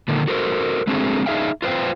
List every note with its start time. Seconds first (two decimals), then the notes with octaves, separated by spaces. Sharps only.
0.08 A#2 D3 D#3
0.28 F#4 A4 A#4 C5
0.87 G#3 A3 C4 D4 F#4 G#4
1.26 D4 D#4 G#4 E5 F5 G5
1.62 F4 B4 C5 F5 G5